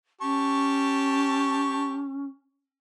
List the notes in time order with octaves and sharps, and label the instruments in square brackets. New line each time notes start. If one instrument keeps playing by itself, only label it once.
[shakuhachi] C#4 [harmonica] G4 A5 C#6